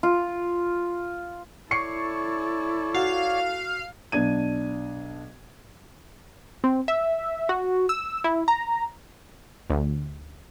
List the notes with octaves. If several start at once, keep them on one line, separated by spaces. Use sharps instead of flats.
F4
E4 A4 C#5 D5 C#6 C7 C#7
F#4 F5
B1 D4 G#6 D#7
C4
E5
F#4
E6
E4
A#5
D2